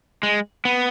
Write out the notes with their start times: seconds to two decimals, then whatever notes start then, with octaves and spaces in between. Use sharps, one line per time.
0.23 G#3
0.65 B3